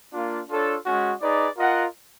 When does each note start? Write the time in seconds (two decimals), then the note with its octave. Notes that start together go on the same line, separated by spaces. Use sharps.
0.13 A#3 D4 F4
0.48 D4 F4 A4 C#5
0.84 G#3 C#4 F#4
1.21 D#4 G#4 B4 D5
1.56 F4 A#4 D#5 F#5